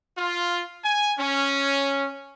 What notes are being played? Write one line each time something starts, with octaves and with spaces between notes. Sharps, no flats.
F4
G#5
C#4